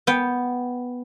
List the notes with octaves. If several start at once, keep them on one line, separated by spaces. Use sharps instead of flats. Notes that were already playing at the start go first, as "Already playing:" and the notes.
B3 G5